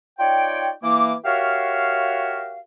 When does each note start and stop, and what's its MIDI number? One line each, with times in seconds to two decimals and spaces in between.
0.19 0.70 63
0.19 0.70 65
0.19 0.70 73
0.19 0.70 74
0.19 0.70 79
0.83 1.14 52
0.83 1.14 58
0.83 1.14 86
1.25 2.60 66
1.25 2.60 67
1.25 2.60 70
1.25 2.60 73
1.25 2.60 76
1.25 2.60 77